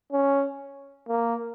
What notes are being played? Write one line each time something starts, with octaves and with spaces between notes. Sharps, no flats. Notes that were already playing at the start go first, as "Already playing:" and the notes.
C#4
A#3